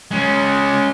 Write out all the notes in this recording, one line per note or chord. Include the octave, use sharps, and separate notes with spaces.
G#3 C#4